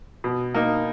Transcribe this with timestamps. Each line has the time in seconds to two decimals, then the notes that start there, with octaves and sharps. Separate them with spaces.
0.24 B2
0.55 A#3 D#4